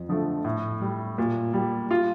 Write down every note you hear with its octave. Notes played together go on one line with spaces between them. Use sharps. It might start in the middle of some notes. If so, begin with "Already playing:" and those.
Already playing: F2
D3 F3 A3
A2
G3
A#2
G3
F4